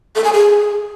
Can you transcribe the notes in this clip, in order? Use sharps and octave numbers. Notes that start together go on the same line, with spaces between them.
A4
G#5
G#4